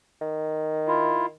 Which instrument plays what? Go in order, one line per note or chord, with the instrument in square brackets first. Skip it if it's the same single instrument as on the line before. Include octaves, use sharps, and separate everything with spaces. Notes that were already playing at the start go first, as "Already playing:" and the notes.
[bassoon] D#3
[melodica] E4 F4